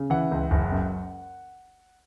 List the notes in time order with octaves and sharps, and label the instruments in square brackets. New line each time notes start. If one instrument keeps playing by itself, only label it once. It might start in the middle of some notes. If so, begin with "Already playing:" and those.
Already playing: [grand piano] C#3
E3 F#5
C#2
F#1
F#2